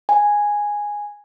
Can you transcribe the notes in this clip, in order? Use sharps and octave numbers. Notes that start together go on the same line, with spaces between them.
G#5